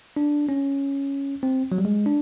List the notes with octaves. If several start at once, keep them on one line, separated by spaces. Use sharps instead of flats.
D4
C#4
C4
F#3
G3
G#3
D4